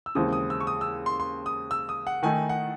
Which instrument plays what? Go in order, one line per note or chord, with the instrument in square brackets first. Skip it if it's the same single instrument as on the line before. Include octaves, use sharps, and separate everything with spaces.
[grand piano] E6
[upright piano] D#2 C#3 E3 G#3 C4 [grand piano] D#6
[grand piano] D#6
E6
C#6
D#6
E6
C6
C6
D#6
E6
D#6
F#5
[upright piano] D#3 A3 D#4 [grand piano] G#5
[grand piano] F#5